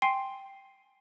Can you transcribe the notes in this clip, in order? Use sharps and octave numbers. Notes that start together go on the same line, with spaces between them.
G5 G#5 C6 C7